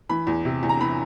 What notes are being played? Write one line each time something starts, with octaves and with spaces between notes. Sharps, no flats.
E3 B5
E2
C3
E2
A#5
E3 B5